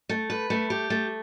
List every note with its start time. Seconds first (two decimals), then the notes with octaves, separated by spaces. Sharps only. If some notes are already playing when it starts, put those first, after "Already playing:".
0.09 A3
0.30 B4
0.50 A3
0.70 G4
0.90 A3